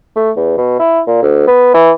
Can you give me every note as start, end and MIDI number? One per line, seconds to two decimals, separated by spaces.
0.16 0.31 57
0.36 0.55 40
0.57 0.76 47
0.80 1.00 64
1.07 1.19 46
1.22 1.46 38
1.47 1.70 59
1.74 1.91 52